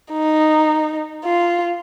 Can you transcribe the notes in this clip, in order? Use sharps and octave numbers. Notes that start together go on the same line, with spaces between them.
D#4
F4